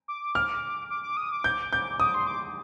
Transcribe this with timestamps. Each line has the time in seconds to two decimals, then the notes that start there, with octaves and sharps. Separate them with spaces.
0.08 D6
0.35 F6
0.90 D6
1.03 D6
1.17 D#6
1.32 D6
1.44 G6
1.73 G6
2.00 D6 D#6
2.14 C6
2.27 D6